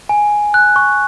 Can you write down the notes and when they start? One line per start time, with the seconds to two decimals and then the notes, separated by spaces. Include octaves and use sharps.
0.09 G#5
0.54 F#6
0.76 C#6